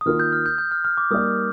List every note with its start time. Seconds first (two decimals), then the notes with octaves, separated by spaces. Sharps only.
0.01 D#6
0.06 D#3 A#3 F4 A#4 F6
0.20 G6
0.33 F6
0.46 G6
0.58 G6
0.71 F6
0.85 F6
0.97 D6
1.10 G3 A#3 D#4 A#4 D5 D#6